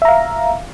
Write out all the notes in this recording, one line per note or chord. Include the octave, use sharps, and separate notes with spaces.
E5 F5 A#5